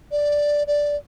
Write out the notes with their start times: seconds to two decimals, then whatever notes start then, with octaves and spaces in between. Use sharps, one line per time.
0.11 D5
0.67 D5